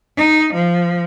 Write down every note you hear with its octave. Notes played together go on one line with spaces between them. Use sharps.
D#4
F3